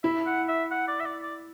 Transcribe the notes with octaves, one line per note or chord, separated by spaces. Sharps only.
E4 E5
F#5
E5
F#5
D5
E5
D5
D5